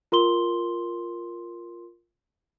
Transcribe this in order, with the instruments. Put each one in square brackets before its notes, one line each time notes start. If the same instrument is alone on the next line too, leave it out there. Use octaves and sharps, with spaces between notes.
[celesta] F4 A#4 C6 G7